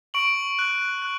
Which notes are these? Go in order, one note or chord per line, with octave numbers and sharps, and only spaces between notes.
C#6 D7 F#7
F#6
F#6